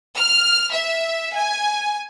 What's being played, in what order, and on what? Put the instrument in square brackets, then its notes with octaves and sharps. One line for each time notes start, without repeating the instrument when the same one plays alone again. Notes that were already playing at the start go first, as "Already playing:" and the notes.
[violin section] F6
E5
G#5